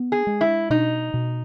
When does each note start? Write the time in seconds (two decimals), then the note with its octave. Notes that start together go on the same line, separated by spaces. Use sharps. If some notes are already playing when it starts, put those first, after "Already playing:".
Already playing: B3
0.12 G#4
0.27 G#3
0.41 E4
0.70 B2 D#4
1.14 B2